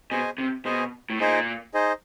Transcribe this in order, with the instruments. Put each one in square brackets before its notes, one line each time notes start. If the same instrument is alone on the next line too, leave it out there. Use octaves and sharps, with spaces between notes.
[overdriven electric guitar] B2 [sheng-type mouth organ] G#4 C5 D#5 G#5
[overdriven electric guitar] C3
[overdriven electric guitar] B2 [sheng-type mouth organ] G#4 C5 D#5 G#5
[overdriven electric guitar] A2
[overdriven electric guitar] A#2 [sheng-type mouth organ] D#4 G#4 C5 D#5
[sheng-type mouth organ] D#4 G#4 C5 D#5